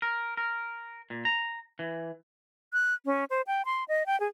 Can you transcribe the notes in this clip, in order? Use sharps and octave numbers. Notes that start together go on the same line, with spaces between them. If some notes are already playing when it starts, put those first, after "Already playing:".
A#4
A#4
A#2
A#5
E3
F#6
C#4
C5
G5
C6
D#5
G5
G#4